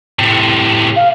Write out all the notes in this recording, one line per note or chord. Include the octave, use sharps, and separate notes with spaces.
A2 C3
F5